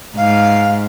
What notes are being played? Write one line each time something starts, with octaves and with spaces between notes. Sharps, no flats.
G#2 F5